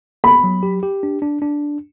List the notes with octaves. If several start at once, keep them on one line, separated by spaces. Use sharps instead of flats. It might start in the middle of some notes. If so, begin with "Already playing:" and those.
B3 B5
F#3
G4
G4
D4
D4
D4